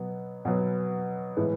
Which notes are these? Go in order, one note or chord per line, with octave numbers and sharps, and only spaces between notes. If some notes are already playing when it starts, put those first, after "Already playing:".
Already playing: B2 F#3 B3
B2 F#3 B3
A2 E3 G#3 B3